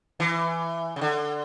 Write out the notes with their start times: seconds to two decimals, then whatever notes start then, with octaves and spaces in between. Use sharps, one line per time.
0.20 E3
0.96 C#3
1.01 D3